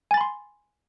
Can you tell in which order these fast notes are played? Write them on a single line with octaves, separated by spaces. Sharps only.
G#5 A6 B5 C6